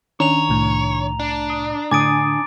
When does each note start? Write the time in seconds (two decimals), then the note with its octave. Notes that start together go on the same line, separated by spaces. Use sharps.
0.20 D#3 C#4 D4 C#5 A#5 F7
0.49 C2 A2
1.20 D4
1.50 D#6
1.91 A2 D3 G#5 D6 D#6 A6 D7